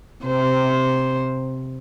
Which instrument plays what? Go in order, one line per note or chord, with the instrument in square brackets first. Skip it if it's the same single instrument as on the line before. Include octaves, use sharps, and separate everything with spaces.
[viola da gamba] C3 C5